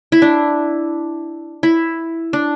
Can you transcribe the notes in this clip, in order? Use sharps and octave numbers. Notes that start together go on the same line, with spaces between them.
E4
D4
E4
D4